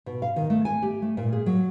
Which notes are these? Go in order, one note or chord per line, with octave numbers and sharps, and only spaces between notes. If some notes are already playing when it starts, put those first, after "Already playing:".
B2
F5
D#3
A3
G#5
G4
A3
A#2
G#4
F#3